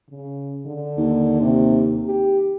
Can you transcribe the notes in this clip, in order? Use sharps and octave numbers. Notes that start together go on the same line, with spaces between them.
C#3
D3
D#2
C3
G4